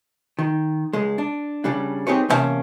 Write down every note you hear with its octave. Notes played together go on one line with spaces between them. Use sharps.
D#3
C#2 G#3
D4
C#3 G3 D4
C4 D#4 G4 G#4 B4 C#5
E2 A2 C3 A#3 C#4 A5